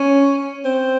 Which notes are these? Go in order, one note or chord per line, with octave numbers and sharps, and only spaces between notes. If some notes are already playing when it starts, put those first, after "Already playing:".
Already playing: C#4
C4